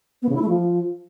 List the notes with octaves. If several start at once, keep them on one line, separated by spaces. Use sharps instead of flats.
B3
C#3
E4
A3
F3